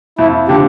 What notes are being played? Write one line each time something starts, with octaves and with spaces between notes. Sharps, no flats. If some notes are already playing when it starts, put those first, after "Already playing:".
F2 E4
D3 F3 G4